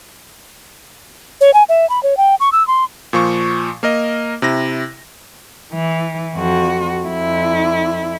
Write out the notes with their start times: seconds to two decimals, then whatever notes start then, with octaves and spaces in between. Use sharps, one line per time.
1.41 C#5
1.54 G#5
1.69 E5
1.90 B5
2.03 C#5
2.17 G5
2.40 C#6
2.52 E6
2.67 C6
3.13 A#2 F3 C#6
3.83 A#3 A#4 D#5
4.42 C3 E4 A#6
5.73 E3
6.36 F2 F#4
7.07 F2 E4